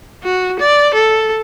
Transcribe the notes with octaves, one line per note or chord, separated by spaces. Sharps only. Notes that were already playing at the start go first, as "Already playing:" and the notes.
F#4
D5
A4